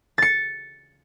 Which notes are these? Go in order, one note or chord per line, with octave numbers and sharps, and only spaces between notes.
A6 C#7